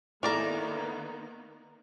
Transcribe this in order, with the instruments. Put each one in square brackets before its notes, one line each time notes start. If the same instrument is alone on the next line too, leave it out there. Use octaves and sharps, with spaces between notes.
[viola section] D#3 A#3 B3 [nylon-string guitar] E4 A4 [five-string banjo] A#4 D5 A#5